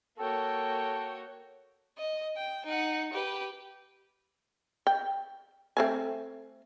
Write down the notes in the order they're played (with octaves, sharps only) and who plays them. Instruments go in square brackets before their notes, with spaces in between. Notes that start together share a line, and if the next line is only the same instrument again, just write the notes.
[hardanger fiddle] A#3 [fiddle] F#4 C#5 [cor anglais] A4 [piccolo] G5
[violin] D#5
G5
D#4 F#5
G4 B4
[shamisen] G5
A3 C4 G#5